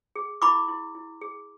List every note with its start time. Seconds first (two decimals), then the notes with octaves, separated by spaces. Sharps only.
0.16 G#4
0.42 E4 B5 D6
0.68 E4
0.95 E4
1.21 G#4